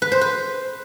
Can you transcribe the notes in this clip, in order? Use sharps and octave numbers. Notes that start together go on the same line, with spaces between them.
B4
C5
B4